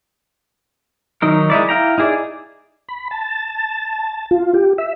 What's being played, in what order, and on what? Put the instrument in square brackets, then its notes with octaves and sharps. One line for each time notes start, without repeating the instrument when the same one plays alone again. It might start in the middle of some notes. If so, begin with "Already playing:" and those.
[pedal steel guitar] D#3 F#3 D#4 A#4
G#3 D#4 E4 D5
E4 F5 G5 A#5
D#4 E4 G#4 D5
[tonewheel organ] B5
A5
F4
G4
E5